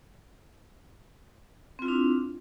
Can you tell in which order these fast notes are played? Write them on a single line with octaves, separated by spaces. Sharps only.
C4 F4 E4 D4